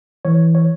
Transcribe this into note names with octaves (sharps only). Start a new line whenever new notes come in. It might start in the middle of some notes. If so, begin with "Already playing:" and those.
E3 C#5
C#5